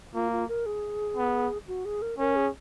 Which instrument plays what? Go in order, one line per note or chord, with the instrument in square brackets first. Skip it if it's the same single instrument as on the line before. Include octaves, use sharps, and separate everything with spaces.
[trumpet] A#3 [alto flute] F4
[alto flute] F4
A#4
G#4
[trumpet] B3
[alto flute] F#4
G#4
A#4
[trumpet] C#4 [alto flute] A#4
[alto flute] G#4